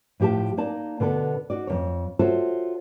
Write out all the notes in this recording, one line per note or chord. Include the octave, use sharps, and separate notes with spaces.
A2 F3 G4 E5 A5
A#3 D#4 D5 A5
B2 D3 B3 A4
D#4 F#4 D5
F2 C3 C#5
F4 F#4 A4 C5 C#5 E5